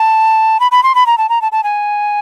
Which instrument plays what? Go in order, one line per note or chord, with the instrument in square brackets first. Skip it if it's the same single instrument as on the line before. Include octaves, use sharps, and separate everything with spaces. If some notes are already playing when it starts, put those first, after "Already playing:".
Already playing: [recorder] A5
B5
B5
C6
B5
A#5
A5
A#5
A5
A5
G#5